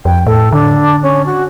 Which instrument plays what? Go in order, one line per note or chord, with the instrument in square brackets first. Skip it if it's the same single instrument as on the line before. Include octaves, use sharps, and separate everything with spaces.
[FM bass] F2 [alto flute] G5
[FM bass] A2 [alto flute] A4
[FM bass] D3 [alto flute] D4
[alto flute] C#4
F#4